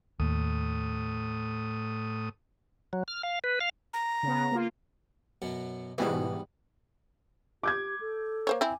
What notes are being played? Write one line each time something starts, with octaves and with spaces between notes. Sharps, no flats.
D#2 A2 D#6
F#3
F6
F5
B4
F5
A#5
C#3 B3
A#3 F4
F#2 B2 F#3
G#2 B2 E3 G3 B3
G4 D6 G6 G#6
A4
A#3 C5 C#5
C4 E4 G#5